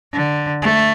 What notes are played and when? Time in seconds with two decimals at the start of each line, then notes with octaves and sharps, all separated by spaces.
0.13 D3
0.62 A3